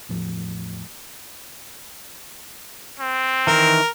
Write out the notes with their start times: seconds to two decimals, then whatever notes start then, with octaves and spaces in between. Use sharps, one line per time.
0.09 E2 A2 F3
3.00 C4
3.47 D#3 E3 A#4